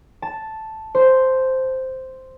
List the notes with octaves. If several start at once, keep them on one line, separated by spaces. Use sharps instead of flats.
A5
C5